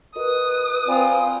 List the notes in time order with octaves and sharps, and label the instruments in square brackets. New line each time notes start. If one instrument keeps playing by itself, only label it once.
[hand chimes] F#4 A#4 D#5 [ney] B4 [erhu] D#6
[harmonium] C4 F4 [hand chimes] D5 G#5 B5